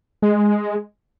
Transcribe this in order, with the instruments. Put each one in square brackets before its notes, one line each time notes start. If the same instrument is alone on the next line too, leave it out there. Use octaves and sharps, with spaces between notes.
[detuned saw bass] G#3